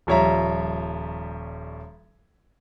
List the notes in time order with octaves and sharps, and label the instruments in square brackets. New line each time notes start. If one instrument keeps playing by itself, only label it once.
[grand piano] D#1 F3 G3 C#5 E5 A#5